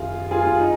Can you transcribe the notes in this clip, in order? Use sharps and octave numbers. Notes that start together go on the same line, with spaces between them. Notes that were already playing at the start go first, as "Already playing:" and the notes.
Already playing: F#2 D#3 F4 G#4
F4 G#4
F4
D#4